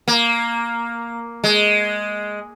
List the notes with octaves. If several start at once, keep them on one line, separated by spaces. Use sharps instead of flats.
A#3
G#3